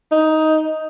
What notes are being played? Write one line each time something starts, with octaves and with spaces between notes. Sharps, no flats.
D#4